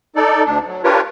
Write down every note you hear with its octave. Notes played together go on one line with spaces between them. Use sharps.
D#4 A4 D5
D2 D4
F#3
D4 F4 G4 A#4 B4 C#5